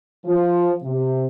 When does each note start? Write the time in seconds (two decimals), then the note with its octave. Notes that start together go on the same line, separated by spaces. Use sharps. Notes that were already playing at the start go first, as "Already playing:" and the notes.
0.24 F3
0.82 C3